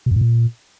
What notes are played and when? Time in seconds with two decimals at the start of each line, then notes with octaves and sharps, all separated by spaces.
0.06 B2
0.11 F#2
0.16 A2
0.21 A#2